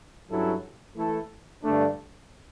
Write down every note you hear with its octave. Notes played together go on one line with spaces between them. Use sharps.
G2 F#3 C#4 E4 A4
E3 A3 E4 A4
G2 D3 A3 D4